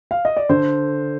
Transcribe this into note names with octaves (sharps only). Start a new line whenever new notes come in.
F5
D#5
D5
D3 C5